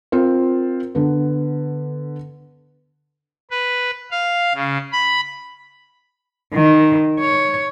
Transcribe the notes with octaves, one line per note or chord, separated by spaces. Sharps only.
C4 F4 A#4 C5
D3 B3
B4
F5
C#3
B5
D#3
C#5